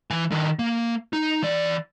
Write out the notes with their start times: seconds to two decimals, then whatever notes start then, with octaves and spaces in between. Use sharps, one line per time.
0.11 E3 G#5
0.32 D#3 D4
0.59 A#3
1.13 D#4
1.42 E3 D5